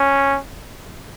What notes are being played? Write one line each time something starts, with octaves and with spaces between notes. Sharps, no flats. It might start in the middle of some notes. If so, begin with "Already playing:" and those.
Already playing: C#4